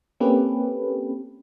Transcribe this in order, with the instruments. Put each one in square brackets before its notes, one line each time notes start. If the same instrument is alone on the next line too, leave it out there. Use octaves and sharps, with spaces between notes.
[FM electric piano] A#3 C4 C#4 G4 A4 B4